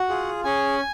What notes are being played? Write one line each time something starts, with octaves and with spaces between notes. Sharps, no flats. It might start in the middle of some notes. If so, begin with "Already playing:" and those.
Already playing: F#4 F#5
F4 G#4
C#4 G#4 G#5